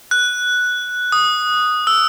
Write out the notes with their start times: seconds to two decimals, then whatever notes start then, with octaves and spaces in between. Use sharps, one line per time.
0.11 F#6
1.12 D#6
1.87 E6